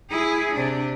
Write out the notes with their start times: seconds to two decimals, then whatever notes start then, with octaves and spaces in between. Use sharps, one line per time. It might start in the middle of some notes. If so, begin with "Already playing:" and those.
0.10 E4 G#4
0.53 C3 D4